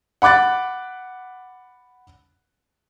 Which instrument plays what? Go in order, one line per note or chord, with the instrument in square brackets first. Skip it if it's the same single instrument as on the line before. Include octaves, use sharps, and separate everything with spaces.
[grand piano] F#5 B5 D6 F#6 A6